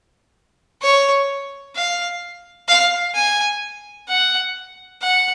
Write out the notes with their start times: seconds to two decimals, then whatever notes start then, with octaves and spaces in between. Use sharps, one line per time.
0.82 C#5
1.76 F5
2.68 F5
3.15 G#5
4.08 F#5
5.02 F#5